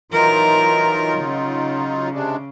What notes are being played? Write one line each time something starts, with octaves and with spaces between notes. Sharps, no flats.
E3 F#3 D#4 F4 A#4
C#3
C3 G#3 D4